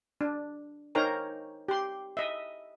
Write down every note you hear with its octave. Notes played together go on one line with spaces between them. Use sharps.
D4
D#4 A#4 C5 C#5 G5 A#5
G4 C6
D#5 E5